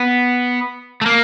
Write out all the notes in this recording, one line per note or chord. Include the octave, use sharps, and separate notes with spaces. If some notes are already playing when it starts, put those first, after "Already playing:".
Already playing: B3
A3
A#3